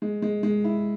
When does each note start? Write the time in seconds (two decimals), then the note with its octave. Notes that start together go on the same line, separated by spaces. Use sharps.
0.02 G#3
0.22 G#3
0.43 G#3
0.64 E4